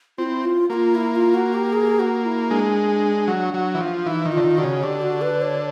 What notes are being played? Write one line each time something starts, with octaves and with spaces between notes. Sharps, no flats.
C4 E4 F4
F4
A#3 F4 F#4
E4
F4
F#4
G4
G#4
F#4
E4
G#3 D4
F#3
F#3
E3
F3
E3 D#4
D#3
D3 F4
D#3
D3 F#4
C#3
D3 G4
F#4
B4
C#5